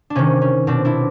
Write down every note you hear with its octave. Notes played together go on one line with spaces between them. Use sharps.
D4
C3 D#3 C#4
C#4
B2 C4 D4
D4 E4